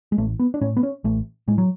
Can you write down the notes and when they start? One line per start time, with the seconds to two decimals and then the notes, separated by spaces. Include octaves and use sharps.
0.12 G#3
0.18 A1 A3
0.39 B3
0.54 D4
0.61 A2 C#4
0.77 B3
0.83 C#4
1.04 A1 A3
1.48 A2 G#3
1.58 F#3